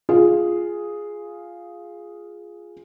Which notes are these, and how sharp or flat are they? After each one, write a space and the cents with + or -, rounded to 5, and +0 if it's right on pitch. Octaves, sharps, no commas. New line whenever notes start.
F4 +0 G#4 +0